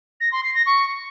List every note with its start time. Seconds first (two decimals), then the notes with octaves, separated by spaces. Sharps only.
0.21 A#6
0.32 C6
0.43 C7
0.55 A#6
0.66 C#6